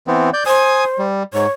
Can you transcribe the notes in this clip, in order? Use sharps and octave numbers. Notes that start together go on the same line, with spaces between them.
E3 B3 C4
D5 G6
C5 G#5 D#6
G3
G#2 C#5